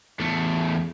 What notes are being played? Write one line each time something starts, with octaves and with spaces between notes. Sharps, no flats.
E2 A3